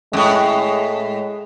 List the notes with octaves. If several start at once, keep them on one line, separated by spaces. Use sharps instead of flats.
F#2 A2 G#3